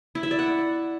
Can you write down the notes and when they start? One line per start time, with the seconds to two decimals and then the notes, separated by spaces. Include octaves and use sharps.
0.15 E4
0.23 E5
0.31 D5
0.39 F#5